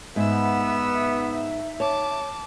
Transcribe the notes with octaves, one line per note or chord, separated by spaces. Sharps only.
G#2 B3 D#4 B4 E5 E6
C#5 A5 D6